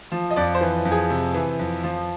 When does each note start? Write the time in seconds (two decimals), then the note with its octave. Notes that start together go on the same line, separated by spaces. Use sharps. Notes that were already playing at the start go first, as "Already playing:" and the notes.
0.12 F3
0.30 D#5
0.36 F2 D5
0.55 C5
0.61 E3
0.85 F2
0.91 G#4
1.10 C3
1.34 E3
1.59 F2
1.84 F3